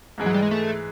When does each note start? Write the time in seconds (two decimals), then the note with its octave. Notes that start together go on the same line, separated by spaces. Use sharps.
0.18 G#2 E3 G#3
0.26 F#3
0.34 G3
0.42 G#3
0.51 A3